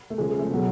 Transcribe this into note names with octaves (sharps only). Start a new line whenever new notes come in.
A3
C#3 F3 G#3
G#3
A3
B2 F#3